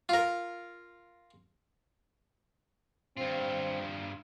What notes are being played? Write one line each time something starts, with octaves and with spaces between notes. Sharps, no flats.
F4 A#4
G2 C4 F4